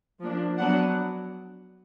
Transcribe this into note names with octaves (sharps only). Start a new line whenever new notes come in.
F3 A#3 D4
F#3 B3 D4 F#5